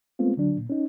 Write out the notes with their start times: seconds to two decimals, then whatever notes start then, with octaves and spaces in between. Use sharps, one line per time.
0.19 G#3 A3 B3 C4 F4
0.36 C#2 D3 F#3 D4
0.56 A#2
0.70 C#4 D#4